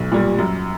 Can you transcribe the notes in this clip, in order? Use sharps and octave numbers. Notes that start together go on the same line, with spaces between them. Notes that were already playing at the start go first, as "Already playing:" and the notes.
Already playing: B1
A#2 G3
F#2